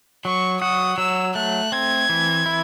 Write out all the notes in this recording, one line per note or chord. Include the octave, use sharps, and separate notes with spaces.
F#3 C#6
F#4 D#6
F#3 E6
A3 F#6
C4 G#6
E3
E4